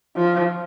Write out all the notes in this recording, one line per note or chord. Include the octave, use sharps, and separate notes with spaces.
F3